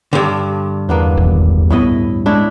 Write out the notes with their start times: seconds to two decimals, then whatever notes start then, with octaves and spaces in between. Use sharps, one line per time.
0.13 G2 D3
0.89 E2 A#3 B3 D4
1.17 E1 A1 D#2
1.70 D2 A2 B3 E4 D#5
2.26 G#3 D4 E4 C#5